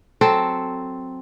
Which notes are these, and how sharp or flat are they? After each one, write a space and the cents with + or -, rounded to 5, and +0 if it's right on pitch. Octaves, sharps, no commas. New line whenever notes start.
F#3 +0 C4 +0 A4 +0